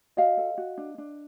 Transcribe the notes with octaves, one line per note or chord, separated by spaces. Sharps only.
F#4 D#5 F5
A4
F#4
D4
D4